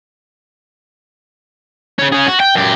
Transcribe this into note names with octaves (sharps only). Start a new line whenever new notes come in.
C#3 C#4
C#4 G#4
F#4
G5
F#2 G4